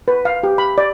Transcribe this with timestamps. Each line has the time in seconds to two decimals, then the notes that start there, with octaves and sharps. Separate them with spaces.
0.08 B4
0.25 F5
0.43 G4
0.58 B5
0.78 D5